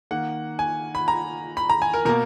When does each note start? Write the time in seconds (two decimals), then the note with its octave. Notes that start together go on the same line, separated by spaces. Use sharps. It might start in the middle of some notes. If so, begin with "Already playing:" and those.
0.11 D#3 A#3 F#5
0.59 G#5
0.95 B5
1.08 A#5
1.57 B5
1.70 A#5
1.82 G#5
1.94 A#4
2.05 B2 A#3 A#4